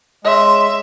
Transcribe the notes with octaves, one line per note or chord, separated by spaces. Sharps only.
G#3 C#5 E5 C6